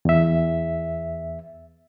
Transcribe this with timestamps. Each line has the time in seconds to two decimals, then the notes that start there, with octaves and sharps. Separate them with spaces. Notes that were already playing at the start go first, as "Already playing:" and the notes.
0.05 E2 E5